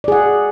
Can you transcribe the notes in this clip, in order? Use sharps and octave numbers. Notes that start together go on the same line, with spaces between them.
G#4 D5 F#5